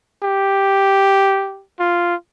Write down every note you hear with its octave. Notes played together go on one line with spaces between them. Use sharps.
G4
F4